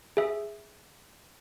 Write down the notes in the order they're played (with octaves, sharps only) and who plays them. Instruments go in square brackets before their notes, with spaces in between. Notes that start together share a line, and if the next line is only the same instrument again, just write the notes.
[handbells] G#4 E5